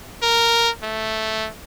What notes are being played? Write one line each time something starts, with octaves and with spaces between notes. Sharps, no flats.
A#4
A3